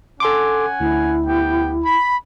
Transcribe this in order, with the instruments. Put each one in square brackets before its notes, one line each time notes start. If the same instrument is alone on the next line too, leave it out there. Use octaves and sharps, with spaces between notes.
[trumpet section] C#4 F#5 G#5 [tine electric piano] A4 C6 D6
[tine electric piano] D2 [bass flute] E4
[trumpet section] B3 G4 G5
B5